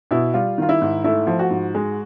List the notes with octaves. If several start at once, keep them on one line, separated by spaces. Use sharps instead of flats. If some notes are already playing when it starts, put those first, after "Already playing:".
B2 E4
G3 F4
D#3 F4
E4
G#2
A3 E4
F3
F#4
G#2
G#3